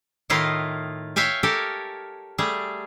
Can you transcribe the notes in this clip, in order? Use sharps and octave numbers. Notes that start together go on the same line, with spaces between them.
A2 D#3 E4 F4 D#5 F5
C#5 E5 F5 G5 G#5
G4 A4 A#4 C#5 G#5
G3 A3 G#4